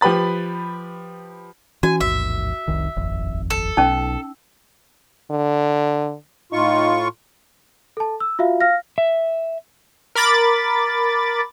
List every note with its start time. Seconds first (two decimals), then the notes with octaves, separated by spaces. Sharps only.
0.01 F3 G4 B4 B5 A6
1.83 E3 C#4 F#4 G#5
2.01 A1 D#2 G#2 E5
2.68 F1 C2 D#3
2.96 D#1 G#1 F2
3.50 A4
3.77 B1 C#4 D#4
5.31 D3
6.52 A2 D#4 F4 C#6
7.97 A4 A5
8.20 E6
8.39 F4 F#4 E5 F5
8.60 F5 F6 A#6
8.98 E5
10.15 A#4 B5 D6 A6